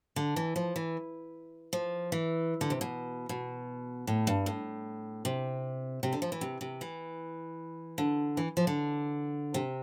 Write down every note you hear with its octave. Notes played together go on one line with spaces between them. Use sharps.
D3
E3
F3
E3
F3
E3
D3
C3
B2
B2
A2
G2
A2
C3
C3
D3
F3
E3
C3
C3
E3
D3
E3
F3
D3
C3